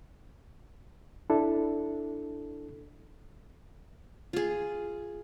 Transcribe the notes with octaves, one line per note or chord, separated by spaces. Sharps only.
D4 E4 A4
F4 G#4